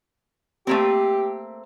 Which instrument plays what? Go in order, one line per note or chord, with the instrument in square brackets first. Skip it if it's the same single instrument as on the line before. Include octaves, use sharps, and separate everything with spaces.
[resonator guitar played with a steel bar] A3 A#3 C4 [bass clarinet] G4